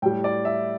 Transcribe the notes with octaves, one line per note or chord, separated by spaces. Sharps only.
A2 G3 G5
D5
E5